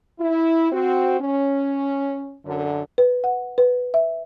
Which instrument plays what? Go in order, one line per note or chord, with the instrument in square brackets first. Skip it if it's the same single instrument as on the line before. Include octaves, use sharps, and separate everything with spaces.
[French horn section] E4
C4 F#4
C#4
F#2 D3
[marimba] B4
F#5
B4
E5